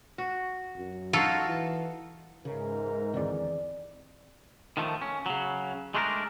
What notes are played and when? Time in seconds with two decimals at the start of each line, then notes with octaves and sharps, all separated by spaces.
0.18 F#4
0.77 F#2
1.13 D#4 F4 F#4 A4 F5
1.47 E3
2.45 G#2 C#3 E3 G#3 A#4
3.14 E2 D3 D#3 C4 D5
4.77 D#3 F3 A3
5.02 C#4
5.26 C#3 F#3
5.95 G#3 A3 D4 G4 A#4